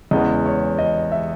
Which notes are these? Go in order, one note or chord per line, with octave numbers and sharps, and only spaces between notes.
E2 C#3 G#3 B3 D#5
C#5
D#5
E5